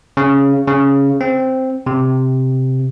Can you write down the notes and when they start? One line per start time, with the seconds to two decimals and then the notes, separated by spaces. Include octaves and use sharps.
0.17 C#3
0.67 C#3
1.21 C4
1.86 C3